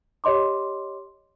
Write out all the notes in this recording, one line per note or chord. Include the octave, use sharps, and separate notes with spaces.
G4 C#5 D#5 C6 D6